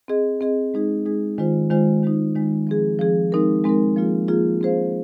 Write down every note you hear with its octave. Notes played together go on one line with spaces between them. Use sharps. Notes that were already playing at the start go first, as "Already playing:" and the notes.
C4 G#4 D#5
C4 G#4 D#5
G#3 D#4 G#4
G#3 D#4 G#4
D#3 G#3 F4 C5
D#3 G#3 F4 C5
D#3 G#3 D#4
D#3 G#3 D#4
F3 C4 G#4
F3 C4 G#4
G#3 C4 D#4 A#4
G#3 C4 D#4 A#4
F3 A#3 F4 G#4
F3 A#3 F4 G#4
C4 G#4 C5 F5